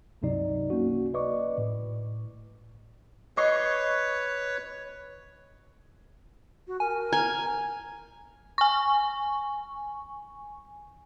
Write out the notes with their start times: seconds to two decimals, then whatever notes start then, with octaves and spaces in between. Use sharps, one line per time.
0.22 C#2 G2 C3 F#3 D#4 D5
0.70 A#3 C#4 F#4
1.14 B4 D5 D#5 C#6 D6
1.58 A2
3.37 B4 C#5 D#5 C#6 C7
6.67 F#4
6.80 A#4 G#5
7.12 G#5 A#5
8.58 G#5 C#6